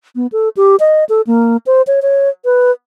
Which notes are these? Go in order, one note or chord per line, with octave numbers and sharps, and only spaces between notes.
B3
A4
G4
D#5
A4
A#3
C5
C#5
C#5
B4